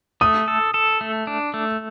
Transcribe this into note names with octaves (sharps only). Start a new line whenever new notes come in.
A3 D#6
A4
A4
A3
D4
A3